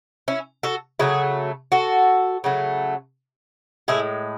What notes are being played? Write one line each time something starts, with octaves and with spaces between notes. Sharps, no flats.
C#4 E4
F#4 A4
C#3 F#3 A3 E4 G#4
F#4 A4
C#3 F#3 A3
A2 G#3 E4 G#4